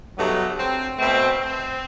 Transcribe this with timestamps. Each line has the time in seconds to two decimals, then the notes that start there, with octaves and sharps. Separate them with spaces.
0.18 G2 F#3 A3 B3 D#4
0.58 C4
0.98 B2 A3 C4
1.39 C4